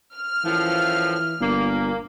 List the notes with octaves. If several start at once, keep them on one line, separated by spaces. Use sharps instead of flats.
F6
F#2 A2 E3 F3
G1 A#2 A#3